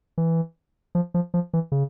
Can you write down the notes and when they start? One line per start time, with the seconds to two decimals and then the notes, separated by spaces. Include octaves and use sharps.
0.18 E3
0.95 F3
1.14 F3
1.34 F3
1.53 E3
1.72 C#3